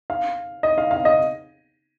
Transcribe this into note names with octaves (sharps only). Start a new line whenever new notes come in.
F5
D#5
F5
F5
D#5